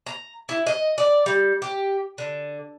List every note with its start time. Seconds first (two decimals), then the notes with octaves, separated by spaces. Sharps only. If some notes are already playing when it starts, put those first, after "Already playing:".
0.06 A#5
0.49 E4
0.67 D#5
0.98 D5
1.26 G3
1.62 G4
2.18 D3